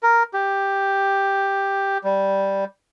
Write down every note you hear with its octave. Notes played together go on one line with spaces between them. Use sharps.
A#4
G4
G3